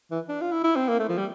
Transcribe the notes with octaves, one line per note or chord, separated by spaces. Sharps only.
E3
D4
F4
E4
E4
C4
A#3
A3
F3
G3